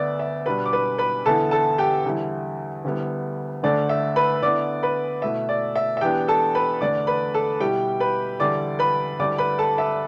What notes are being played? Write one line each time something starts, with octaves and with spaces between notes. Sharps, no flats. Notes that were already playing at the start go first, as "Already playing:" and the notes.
Already playing: D2 D3 B3 D5 E5
E5
B2 G3 D4 B4 B5
D6
B4 B5
B4 B5
E2 D3 B3 E4 A4 A5
A4 A5
G4 G5
E2 D3 G3 E4
D2 D3 G3 B3 E4
D2 D3 A3 D4 D5
E5
B4 B5
D3 B3 E4 D5 D6
B4 B5
B2 A3 E4 E5
D5
E5
E5
E2 E3 B3 D4 G4 G5
A4 A5
B4 B5
E2 D3 A3 D4 D5 D6
B4 B5
A4 A5
B2 G3 E4 G4 G5
B4 B5
E2 D3 G3 E4 D5 D6
B4 B5
D2 D3 G3 E4 D5 D6
B4 B5
A4 A5
E5